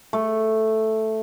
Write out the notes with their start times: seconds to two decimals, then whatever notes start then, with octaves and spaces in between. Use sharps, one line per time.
0.13 A3